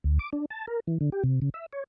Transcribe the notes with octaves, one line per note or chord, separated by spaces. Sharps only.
D2
D6
D4
A5
A#4
E3
D3
G4
C3
C#3
E5
C#5